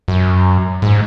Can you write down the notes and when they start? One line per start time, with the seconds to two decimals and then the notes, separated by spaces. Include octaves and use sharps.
0.08 F#2
0.82 G#2